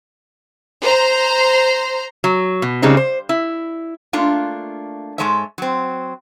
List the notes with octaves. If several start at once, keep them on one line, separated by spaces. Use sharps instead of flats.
C5 A#5 C6
F#3
B2
C#3 G3 G#3 C4 D#4
C5
E4
A3 A#3 D4 F4
G#2 E3 G#3 A4 C#5 E5
F#3 C4